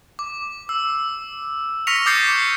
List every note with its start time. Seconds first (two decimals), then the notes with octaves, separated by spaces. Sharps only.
0.19 D6
0.69 E6
1.87 C#6 F6 A#6 B6 C#7 F7
2.06 D6 D#6 G6 A6 C7 C#7